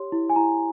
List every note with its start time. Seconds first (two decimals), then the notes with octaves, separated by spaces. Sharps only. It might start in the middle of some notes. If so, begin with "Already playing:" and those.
Already playing: G4 C#5 C6
0.12 E4
0.30 G#5
0.36 E4 A#5